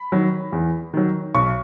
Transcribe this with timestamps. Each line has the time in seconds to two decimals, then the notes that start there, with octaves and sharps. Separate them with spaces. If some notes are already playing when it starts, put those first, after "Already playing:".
Already playing: B5
0.12 D#3 F#3
0.52 E2
0.94 D#3 F#3
1.34 B1 C#6